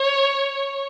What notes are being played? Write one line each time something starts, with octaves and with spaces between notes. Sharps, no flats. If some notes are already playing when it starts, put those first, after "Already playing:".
Already playing: C#5